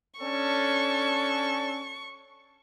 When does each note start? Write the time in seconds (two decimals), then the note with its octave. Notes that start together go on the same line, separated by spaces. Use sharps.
0.20 C#4 D4 A4 C#6